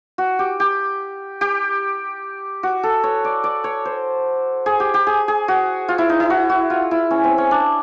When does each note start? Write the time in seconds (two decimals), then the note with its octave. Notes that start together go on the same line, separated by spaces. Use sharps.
0.18 F#4
0.39 G4
0.60 G4
1.41 G4
2.63 F#4
2.83 A4
3.04 C#5
3.24 D5
3.44 D5
3.64 C#5
3.85 C5
4.66 G#4
4.80 G4
4.94 G4
5.07 G#4
5.28 G#4
5.48 F#4
5.88 F4
5.98 E4
6.09 D#4
6.20 E4
6.30 F#4
6.50 F#4
6.70 F4
6.91 E4
7.11 C#4
7.24 C4
7.38 C#4
7.51 D4